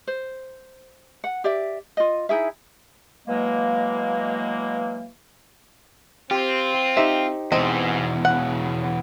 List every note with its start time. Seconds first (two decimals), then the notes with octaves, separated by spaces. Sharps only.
0.07 C5
1.24 F#5
1.44 G4 D5 E5
1.97 F4 D#5
2.29 D#4 E4 G#4 E5
3.27 B2 E3 F#3 G#3 A#3
6.31 C4 F4 G4
6.97 D#4 G4 C5 E5
7.52 E2 G#2 B2 C4 D#5
8.25 C#3 F#5